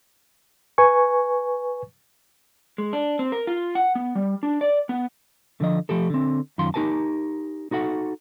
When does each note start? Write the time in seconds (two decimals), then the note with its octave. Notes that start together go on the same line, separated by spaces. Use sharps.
0.78 B4 G#5 C#6
2.78 G#3
2.93 D4
3.19 C4
3.32 A#4
3.47 F4
3.75 F#5
3.95 B3
4.15 G3
4.43 D4
4.61 D5
4.89 B3
5.60 D3 F3 D#5
5.89 F3 A3 G4 A4
6.10 D3 C4
6.58 F#2 D#3 F4 C6
6.74 D#4 G4 A#4 G#5 A5
7.71 D#4 F#4 A4 F#5